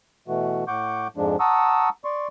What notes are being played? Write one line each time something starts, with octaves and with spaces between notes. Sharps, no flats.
B2 E3 A3 F#4
A2 F#5 C#6 D6 G6
F2 G#2 F3 G#3 D4
F#5 A5 A#5 C#6 D#6 E6
D5 C6 C#6